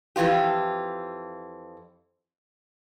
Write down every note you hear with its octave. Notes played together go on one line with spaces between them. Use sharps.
F2 C3 E3 F4 G4